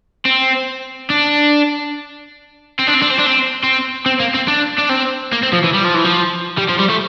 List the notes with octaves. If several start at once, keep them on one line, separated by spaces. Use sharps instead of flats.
C4
D4
C4
D4
C4
D4
C4
D4
C4
C4
C4
A#3
C4
D4
D4
C4
A#3
C4
F3
E3
G3
F3
E3
F3
G3
F3
G3
A3